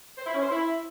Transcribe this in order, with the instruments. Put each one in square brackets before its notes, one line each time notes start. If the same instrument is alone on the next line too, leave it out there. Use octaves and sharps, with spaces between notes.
[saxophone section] C5
E4
C#4
C5
E4